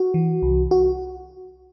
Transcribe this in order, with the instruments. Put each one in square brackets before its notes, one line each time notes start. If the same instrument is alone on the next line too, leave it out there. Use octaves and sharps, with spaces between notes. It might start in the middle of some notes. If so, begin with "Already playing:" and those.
Already playing: [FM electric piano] F#4
E3
C2
F#4